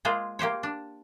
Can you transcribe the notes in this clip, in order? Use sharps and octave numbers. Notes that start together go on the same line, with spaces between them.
G#3 A#3 F4 G#4 C5
A#3 G4 C5 C#5
D4